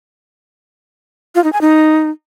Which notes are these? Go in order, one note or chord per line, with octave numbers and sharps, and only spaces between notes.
F4
D#4
G#5
D#4